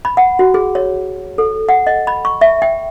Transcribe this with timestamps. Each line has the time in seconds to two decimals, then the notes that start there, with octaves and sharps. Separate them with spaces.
0.05 B5
0.17 F#5
0.39 F#4
0.54 G#4
0.75 C#5
1.38 A4
1.69 F#5
1.87 D#5
2.07 B5
2.25 C#6
2.41 E5
2.62 G5